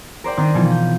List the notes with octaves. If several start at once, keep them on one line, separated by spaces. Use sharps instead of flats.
A#4 C5 D5 G5
D#3 C4 D4 D#4 D#5 A#5
B2 E3 F3 D#4
G6